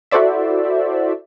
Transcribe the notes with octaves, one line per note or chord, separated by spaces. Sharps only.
E4 F#4 A4 C5 D5 E5